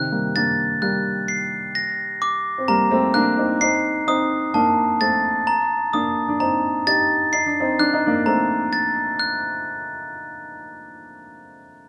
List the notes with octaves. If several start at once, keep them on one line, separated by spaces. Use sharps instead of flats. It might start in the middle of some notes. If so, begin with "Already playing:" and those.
Already playing: C3 D#3 F#6
G3 A#3
A#3 D4 A6
G3 A#3 F#6
C7
A#6
D6
C4
G3 A#3 A#5
A3 C4
A#3 D4 F#6
C4 D#4
C4 D#4 C7
C4 D#4 D#6
A#3 D4 A5
A3 C4 A6
A#5
A#3 D4 D#6
D4
C4 D#4 A#5
D#4 G4 A6
D#4 C7
D4
C4 D#4
D4 F#6
D#4
A#3 D4
A3 C4 A#5
A6
F#6